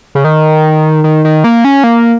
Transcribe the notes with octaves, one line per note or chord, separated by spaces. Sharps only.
C#3
D#3
D#3
D#3
A#3
C#4
A#3